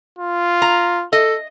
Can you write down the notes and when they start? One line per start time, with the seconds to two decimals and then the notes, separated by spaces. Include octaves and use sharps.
0.18 F4
0.62 A#5
1.13 A4 D#5